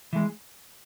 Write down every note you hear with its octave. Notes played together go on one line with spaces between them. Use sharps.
E3 G#3